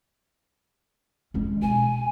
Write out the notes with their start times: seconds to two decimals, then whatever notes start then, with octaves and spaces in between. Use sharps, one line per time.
1.34 G#3 C#4
1.62 B2 G#5